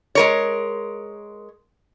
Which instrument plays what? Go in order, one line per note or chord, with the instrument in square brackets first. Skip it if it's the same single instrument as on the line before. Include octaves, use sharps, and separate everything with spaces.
[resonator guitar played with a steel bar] G#3 A#4 C#5